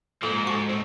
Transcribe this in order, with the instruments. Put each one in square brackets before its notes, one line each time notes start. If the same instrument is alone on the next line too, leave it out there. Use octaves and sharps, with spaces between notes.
[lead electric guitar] G#2 [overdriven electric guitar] F3 A#3 [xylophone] A4
[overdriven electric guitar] F#4 A4 [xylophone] C#6
[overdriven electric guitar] A#2 C4